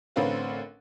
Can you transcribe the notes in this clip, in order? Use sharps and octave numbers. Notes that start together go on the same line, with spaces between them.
A1 D3 C4 A#4 B4 F5